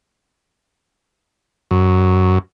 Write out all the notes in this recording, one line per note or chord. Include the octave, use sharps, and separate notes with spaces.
F#2